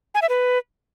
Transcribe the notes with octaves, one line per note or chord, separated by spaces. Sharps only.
G#5
E5
B4